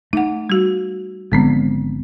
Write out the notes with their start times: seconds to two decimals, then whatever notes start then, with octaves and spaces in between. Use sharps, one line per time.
0.13 A3 D#4 F#5
0.50 G3 F#4
1.32 G#1 D3 F3 G#3 B3 C4